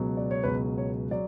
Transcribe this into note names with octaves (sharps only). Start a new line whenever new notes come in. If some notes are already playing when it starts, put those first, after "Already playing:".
Already playing: C#2 B2 F#3
D5
C#5
C#2 B2 F#3 B4
C#5
F#3 D5